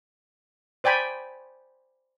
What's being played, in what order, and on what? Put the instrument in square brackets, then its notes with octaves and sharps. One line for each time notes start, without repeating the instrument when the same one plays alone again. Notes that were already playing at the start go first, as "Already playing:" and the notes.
[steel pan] C5 D5 G5 G#5 B5